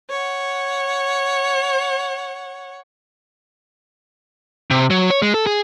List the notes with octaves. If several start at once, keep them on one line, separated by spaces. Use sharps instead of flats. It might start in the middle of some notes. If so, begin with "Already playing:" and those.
C#5 F#5
C3
F#3
C#5
G#3
A4
G#4